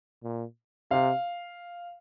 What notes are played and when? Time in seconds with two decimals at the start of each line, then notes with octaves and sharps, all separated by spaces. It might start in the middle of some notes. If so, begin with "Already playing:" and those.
0.23 A#2
0.91 C3 F5